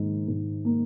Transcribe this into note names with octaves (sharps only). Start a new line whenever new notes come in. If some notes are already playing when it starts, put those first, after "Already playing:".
Already playing: G#2 D#3 A#3
G#2
A#3